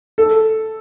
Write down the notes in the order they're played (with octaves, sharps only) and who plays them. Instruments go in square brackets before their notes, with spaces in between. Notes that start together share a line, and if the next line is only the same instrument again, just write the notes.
[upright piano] A4